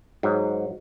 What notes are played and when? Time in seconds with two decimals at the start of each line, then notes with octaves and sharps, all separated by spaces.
0.23 G#2 F#3